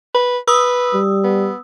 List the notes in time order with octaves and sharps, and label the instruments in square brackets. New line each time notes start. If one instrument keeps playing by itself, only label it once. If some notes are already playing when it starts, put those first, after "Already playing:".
[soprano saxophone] B4
[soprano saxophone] B4 [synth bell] D#6 E6
[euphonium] G3
[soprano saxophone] B3